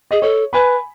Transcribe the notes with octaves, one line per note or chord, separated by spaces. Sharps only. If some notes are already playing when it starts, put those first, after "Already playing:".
G#4 D#5
A4 C#5
B4 G#5 B5